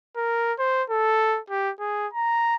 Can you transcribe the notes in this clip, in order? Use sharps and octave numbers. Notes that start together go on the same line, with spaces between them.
A#4
C5
A4
G4
G#4
A#5